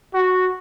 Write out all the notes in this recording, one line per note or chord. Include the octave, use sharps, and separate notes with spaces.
F#4